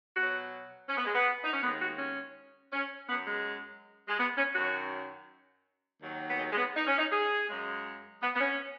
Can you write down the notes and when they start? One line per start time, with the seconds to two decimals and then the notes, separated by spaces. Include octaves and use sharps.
0.15 B2 F#3 F#4
0.89 C#4
0.97 B3
1.05 G#3
1.14 B3
1.44 D#4
1.53 C#4
1.61 D#2 D#3 G#3 B3
1.81 F#4
1.98 C#4
2.72 C#4
3.09 F#2 F#3 B3
3.27 G#3
4.07 G#3
4.18 B3
4.37 C#4
4.55 F#2 D#3 F#3 F#4
6.02 D#2 D#3 F#3
6.28 B3
6.38 G#3
6.51 G#3
6.57 B3
6.75 D#4
6.86 C#4
6.98 D#4
7.12 G#4
7.48 F#2 C#3 G#3
8.21 B3
8.34 B3
8.40 C#4